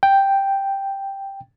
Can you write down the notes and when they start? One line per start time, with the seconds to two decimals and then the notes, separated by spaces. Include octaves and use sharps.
0.03 G5